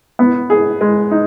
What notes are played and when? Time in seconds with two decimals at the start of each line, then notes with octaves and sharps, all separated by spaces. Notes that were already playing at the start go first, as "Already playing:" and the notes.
0.19 B3
0.50 G#4
0.81 G#3
1.11 D#4